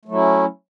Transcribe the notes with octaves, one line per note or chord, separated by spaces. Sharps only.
F#3 A3 C#4 E4